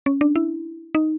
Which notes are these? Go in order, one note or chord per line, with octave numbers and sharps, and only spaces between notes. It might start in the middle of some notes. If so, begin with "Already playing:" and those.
C#4
D4
E4
D#4